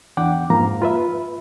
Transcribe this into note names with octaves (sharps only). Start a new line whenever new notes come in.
E2 D4 F#5 G5 D6
F2 G#2 F3 A#3 F5 A#5
F4 B4 E5